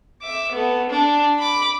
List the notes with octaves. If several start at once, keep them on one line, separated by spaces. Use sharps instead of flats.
E5 D6
A3 B3
D4
B5 D6